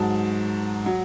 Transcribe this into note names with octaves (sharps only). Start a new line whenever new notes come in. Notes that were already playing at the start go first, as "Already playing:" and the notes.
Already playing: G#2 F#3 A5
F#3